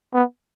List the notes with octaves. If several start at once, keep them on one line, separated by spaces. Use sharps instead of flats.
B3